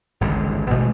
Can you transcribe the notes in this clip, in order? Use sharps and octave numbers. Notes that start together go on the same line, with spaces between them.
G#1 C#2 G2 D3
A1 B2 G#3 A3